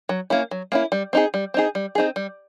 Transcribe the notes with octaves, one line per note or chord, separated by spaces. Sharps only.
F#3
A#3 C#4 E4
F#3
A#3 C#4 E4
G3
C4 D#4 G#4
G3
C4 D#4 G#4
G3
C4 D#4 G#4
G3